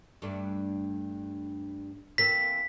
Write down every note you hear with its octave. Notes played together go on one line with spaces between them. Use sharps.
G2 A3 D4
E3 A#3 C4 B6